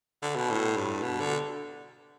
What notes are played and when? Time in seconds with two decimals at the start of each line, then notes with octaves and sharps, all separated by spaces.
0.22 D3
0.36 B2
0.51 A2
0.77 G2
1.02 B2
1.21 D3